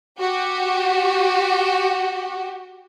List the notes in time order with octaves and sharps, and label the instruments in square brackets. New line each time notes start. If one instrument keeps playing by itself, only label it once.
[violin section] F#4 G4